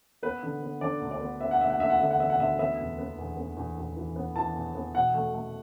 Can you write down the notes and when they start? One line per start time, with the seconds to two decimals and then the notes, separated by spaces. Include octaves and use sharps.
0.23 B3 B4
0.43 D3
0.62 B3
0.81 D3 D5
1.01 D2
1.11 D5
1.21 B3
1.41 B3 E5
1.51 F#5
1.61 D2 E5
1.70 F#5
1.80 D2 E5
1.90 F#5
2.00 D3 E5
2.11 F#5
2.19 B3 E5
2.30 F#5
2.39 D2 E5
2.59 B3 E5
2.79 E2
2.99 B3
3.18 E2
3.37 B3
3.57 E2
3.77 E2
3.96 E3
4.16 B3
4.36 E3 A5
4.55 E2
4.75 B3
4.94 B2 F#5
5.14 A3
5.34 A3